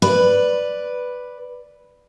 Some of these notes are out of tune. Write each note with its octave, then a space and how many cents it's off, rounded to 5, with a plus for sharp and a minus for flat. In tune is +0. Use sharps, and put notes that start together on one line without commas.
B4 +0 D5 +0